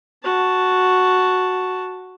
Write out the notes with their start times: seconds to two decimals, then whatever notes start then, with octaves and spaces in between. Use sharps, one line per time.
0.24 F#4 A5